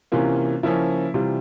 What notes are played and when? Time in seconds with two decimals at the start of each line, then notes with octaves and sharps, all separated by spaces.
0.12 C3 E3 A#3 C#4 F4
0.63 C#3 F3 A#3 C#4 E4
1.14 C3 E3 G3 F4